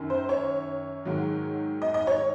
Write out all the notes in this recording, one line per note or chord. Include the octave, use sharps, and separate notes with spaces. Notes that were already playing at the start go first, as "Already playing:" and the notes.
Already playing: F#2 D#3
C5
C#5
G#2 D#3 F#3
D#5
D#5
C#5